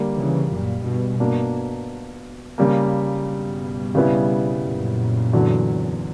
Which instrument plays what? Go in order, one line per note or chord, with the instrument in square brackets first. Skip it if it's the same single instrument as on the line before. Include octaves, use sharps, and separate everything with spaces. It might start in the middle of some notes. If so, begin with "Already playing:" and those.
Already playing: [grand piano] D3 G3 A#3
[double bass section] C#3 E3
F#2 A#2
G2 B2
[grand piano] B2 A#3 D4
C#3 G3 A#3
[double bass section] G2 B2
[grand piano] C#3 G3 B3 E4
[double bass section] F#2 A#2
[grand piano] E2 D3 F#3